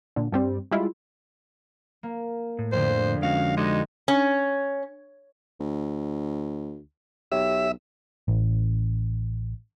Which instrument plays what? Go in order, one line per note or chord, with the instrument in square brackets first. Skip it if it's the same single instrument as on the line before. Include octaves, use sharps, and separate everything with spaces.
[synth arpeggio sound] A#2 D3
G2 G3 C4
G3 G#3 E4 F4
[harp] A#3
[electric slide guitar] A2
[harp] F2 D3 [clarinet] C5
[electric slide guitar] G#3 C#4 F#4 [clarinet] F5
[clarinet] G#3 [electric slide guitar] D#4 F#4 [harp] G4 A4 D#5
[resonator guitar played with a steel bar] C#4
[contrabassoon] D2
[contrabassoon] B1 [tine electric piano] G4 C#5 G5 [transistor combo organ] E5
[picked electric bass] A1